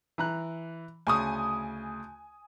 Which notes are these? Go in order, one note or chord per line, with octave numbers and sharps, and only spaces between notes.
E3 A#5 F#6
D2 C#3 G#5 C#6 D#6